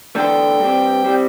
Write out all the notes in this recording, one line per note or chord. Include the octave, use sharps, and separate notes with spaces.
E2 D3 A3 D4 A4 G5
G2 G3 C4
G3 C4